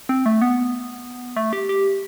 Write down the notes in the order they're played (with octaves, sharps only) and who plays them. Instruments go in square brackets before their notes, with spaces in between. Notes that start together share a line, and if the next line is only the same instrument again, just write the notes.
[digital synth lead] C4
A3
B3
A3
G4
G4